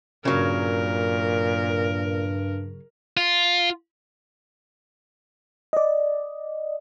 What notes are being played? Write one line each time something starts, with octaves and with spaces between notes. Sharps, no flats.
G2 A#2 C#3 F#3 A#4
F4
D5 D#5